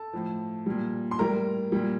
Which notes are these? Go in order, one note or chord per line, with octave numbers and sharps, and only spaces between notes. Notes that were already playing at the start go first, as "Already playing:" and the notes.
Already playing: A4 A5
A2 F3
A#2 G3
C6
A2 G3 A#4 A#5
A#2 G3